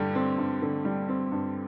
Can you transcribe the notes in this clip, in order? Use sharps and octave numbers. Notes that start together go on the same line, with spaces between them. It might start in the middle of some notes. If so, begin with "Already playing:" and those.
Already playing: G2 D3 G3
C4
G2
D3
G3
C4
G2